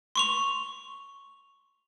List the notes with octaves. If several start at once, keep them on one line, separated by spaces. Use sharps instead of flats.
C6 C#6 F7